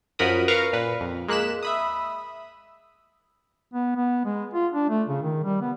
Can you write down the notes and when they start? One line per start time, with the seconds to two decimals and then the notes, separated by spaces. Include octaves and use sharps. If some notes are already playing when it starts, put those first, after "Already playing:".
0.19 F#2 F3 F#4 A#4 B5 D#6
0.48 A#4 B4 F5 A#5 C#6 F6
0.73 A#2 B4
1.01 F2
1.28 G#3 A#3 F#6 B6 E7
1.63 E5 B5 D#6
3.73 B3
3.96 B3
4.25 G#3
4.54 F4
4.73 D4
4.90 A3
5.09 C#3
5.23 D#3
5.44 G3
5.61 B3